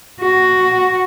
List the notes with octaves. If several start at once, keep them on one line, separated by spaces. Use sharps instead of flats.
F#4